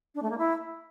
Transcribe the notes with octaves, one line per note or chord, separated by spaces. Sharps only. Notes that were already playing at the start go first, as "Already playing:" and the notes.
D4
A3
A#3
E4